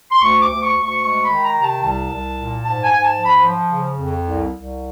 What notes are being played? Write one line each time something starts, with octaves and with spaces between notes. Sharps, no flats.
C6
D2 C#6
D6
D2
C#6
D2
C#6
G#3 C#6
B5
D#3
A#5
C3
A5
C2 A5
C2
A#2
G#2 A5
G#5
G#2
A5
F3
B5
F3
C#3
F2
C2
C2